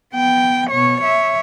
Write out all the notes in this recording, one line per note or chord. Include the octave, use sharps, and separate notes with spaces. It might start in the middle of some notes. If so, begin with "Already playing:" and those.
B3 G5
B2 C#5
C#5 E5